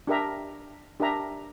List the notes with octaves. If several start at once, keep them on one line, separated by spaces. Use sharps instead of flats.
D4 G4 A#4 E5 A#5
D4 G4 A#4 E5 A#5